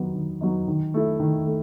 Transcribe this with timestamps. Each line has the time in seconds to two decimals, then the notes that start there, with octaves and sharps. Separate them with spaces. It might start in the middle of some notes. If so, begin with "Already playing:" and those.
Already playing: D#3 F#3 B3 D#4
0.14 D#3
0.41 F#3 B3 D#4
0.68 D#3
0.94 A3 E4
1.20 D#3
1.46 A3